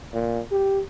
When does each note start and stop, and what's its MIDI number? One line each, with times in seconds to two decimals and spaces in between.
0.14 0.40 46
0.51 0.81 67